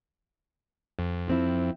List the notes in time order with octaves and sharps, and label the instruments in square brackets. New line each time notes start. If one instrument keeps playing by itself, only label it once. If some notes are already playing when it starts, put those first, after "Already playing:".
[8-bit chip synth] F2
[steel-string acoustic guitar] F3 C4 E4